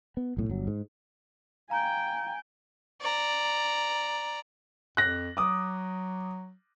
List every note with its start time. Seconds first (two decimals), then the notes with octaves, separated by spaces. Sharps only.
0.17 B3
0.37 B1 A2
0.49 G1 F#3
0.67 G#2
1.70 F5 G5 G#5 A#5
3.01 D5 A#5
4.97 F2 F#6 A#6
5.37 F#3 D6 D#6